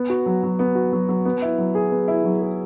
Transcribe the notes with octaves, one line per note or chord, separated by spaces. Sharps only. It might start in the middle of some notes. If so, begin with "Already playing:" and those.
Already playing: B3
F#4
F#3
F#3
B3
F#4
F#3
F#3
B3
E4
F#3
G#4
B3
E4
F#3
G#4